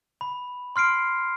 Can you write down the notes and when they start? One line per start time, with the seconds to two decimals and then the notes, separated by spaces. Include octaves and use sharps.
0.21 B5
0.76 C6 F6 C7 D7